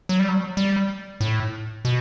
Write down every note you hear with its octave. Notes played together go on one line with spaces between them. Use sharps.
F#3
G3
F#3
G3
A2
B2